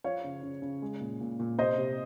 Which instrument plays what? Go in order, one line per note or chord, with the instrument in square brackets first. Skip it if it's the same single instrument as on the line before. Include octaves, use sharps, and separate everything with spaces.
[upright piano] F3 C#5 F5
C#3
C#3
C#3
G#3
A#2
A#2
A#2
C3 C5 D#5
C3